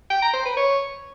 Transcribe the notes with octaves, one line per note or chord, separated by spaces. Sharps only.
G5
A#5
C5
B4
C#5